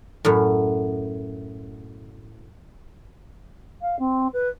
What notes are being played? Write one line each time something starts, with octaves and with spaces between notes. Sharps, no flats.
F#2 A2
F5
C4
B4